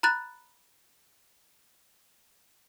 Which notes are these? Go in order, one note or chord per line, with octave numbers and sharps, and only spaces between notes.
A#5 B5 F#6 A6